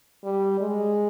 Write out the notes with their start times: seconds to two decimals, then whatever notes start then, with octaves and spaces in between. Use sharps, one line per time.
0.24 G3
0.61 G#3